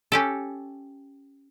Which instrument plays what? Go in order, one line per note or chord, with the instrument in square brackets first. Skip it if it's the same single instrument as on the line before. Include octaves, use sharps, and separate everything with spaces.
[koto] C#4 G4 A4